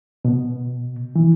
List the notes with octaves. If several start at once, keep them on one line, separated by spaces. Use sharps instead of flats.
B2
E3